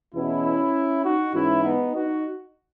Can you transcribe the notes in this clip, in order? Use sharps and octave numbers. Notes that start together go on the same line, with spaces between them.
E2 B2 C#4 E4
D#4 F#4
G#2 E3 C#4 E4
B3 D#4
D#4 F#4